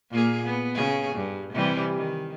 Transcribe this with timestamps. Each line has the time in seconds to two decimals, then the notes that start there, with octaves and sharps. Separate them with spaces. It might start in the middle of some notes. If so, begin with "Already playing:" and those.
0.10 A#2 A#3 G#4
0.46 B3
0.75 C#3 G#4
1.15 G2
1.53 C3 E3 G3
1.96 D#3